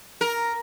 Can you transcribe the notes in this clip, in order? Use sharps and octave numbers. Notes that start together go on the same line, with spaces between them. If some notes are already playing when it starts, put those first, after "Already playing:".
A#4